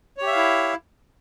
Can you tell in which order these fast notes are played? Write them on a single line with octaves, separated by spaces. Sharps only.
C#5 G4 E5 F5 E4